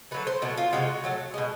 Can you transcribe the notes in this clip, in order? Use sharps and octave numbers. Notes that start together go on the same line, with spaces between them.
D3 F#3 A3 B4
C5
B2 F#3 A3 F#4
F4
C3 F3 G#3 F#4
A2 F#3 A3
B2 G#3